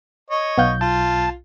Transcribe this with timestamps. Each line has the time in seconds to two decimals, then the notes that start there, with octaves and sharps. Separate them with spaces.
0.30 C#5 D#5
0.58 B1 B3 F5 F#5 G6
0.81 F4 A5